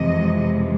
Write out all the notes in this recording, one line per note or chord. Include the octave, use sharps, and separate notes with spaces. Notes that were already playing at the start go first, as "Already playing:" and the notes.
Already playing: F2 C3 E3 G#3 D#5